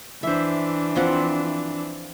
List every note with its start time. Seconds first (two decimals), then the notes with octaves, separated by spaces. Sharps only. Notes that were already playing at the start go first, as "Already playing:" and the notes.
0.23 E3 D4 C5 E5
0.95 F3 C4 F#5